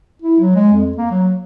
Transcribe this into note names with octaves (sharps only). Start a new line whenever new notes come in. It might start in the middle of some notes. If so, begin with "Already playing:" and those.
E4
F#3
G#3
F2
A#3
F#3